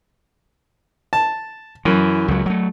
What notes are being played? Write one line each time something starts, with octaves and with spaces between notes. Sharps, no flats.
A5
F#2 E3
C#2 F#3
F#3 A3